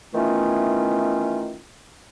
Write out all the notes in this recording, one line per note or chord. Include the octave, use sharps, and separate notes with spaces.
D#3 E3 A3 B3 C#4 F4